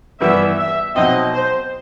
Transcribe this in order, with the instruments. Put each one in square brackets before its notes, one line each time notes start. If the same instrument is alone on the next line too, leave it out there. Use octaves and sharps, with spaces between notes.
[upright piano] G2 E3 B3 E4 [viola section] E5
[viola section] E5
[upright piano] B2 F#3 C4 D#4 [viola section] D#5
[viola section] C5